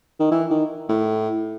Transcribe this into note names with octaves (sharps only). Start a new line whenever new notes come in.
D#3
E3
D#3
A2